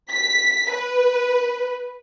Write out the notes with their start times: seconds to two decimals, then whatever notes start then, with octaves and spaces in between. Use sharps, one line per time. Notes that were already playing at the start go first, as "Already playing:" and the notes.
0.11 B6
0.71 B4